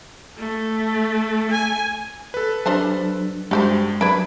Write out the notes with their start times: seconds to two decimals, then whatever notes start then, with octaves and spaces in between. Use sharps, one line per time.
0.38 A3
1.51 G#5
2.34 A4 B4
2.66 F#3 G3 D4 C5 A5
3.51 G2 G#3 F#4 G4 C5
4.01 F#3 D4 B4 B5 G#6 D7